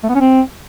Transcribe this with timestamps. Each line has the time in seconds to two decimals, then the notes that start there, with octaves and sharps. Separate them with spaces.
0.03 A3
0.09 B3
0.15 C#4
0.21 C4